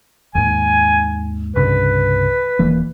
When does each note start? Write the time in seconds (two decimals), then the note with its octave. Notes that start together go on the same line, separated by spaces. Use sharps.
0.35 D#2 G#2 G#5
1.56 C2 G2 C#3 B4
2.59 D#1 E3 A#3